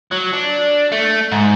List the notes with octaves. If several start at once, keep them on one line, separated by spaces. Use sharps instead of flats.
F#3
D4
A3
G#2